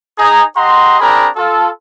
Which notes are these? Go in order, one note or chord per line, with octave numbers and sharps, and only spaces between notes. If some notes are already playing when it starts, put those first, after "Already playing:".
D#4 G#4 A#5
G4 D#5 F#5 A#5 C6
C4 D4 G#4 A#4 A#5 B5
F4 A4